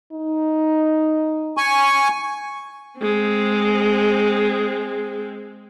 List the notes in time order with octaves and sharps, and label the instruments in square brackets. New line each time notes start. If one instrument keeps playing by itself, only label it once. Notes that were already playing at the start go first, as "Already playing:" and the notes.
[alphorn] D#4
[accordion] G#5 C#6
[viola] G#3 C4